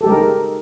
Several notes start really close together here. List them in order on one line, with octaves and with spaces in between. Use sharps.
A4 G4 G#3 A#4 D#4